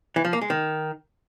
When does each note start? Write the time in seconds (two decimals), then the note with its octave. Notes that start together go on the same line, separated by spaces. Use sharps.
0.16 E3
0.25 F3
0.33 A#3
0.41 G#3
0.50 D#3